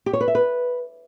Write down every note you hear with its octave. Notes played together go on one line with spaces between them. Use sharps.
G4
C#5
B4
E5
B4